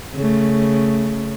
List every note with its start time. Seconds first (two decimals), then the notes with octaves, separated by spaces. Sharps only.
0.14 C#3 A3